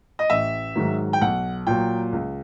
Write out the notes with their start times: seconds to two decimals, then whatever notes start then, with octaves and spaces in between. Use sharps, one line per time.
0.19 D#5
0.30 A1 E5
0.76 G#2 D#3 F#3
1.13 G5
1.21 B1 F#5
1.67 A#2 F#3 G5
2.12 C#2